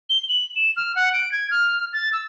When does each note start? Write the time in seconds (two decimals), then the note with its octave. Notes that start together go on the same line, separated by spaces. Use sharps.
0.10 G7
0.29 F#7
0.56 E7
0.77 F6
0.96 F#5
1.13 D7
1.32 G#6
1.51 F6
1.93 A6
2.13 E6